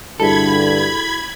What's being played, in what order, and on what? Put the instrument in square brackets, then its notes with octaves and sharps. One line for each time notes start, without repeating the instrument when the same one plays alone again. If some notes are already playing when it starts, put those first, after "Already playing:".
[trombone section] G2 D3 [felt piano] E4 F#4 G#4 [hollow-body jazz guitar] A4 [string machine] B5 G#6